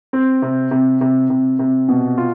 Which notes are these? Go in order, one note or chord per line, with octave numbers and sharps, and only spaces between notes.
C4
C3
C3
C3
C3
C3
B2
F4